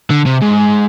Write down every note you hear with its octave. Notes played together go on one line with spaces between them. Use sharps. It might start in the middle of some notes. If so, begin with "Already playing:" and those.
D3
C3
G#2